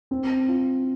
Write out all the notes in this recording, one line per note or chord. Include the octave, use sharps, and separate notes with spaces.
C4
F4